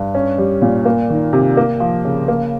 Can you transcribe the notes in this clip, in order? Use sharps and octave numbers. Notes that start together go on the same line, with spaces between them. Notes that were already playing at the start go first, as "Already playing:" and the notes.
Already playing: G2
C#4
G3
A#2
A#3
D#3
C3
A#3
F3
C#3
A#3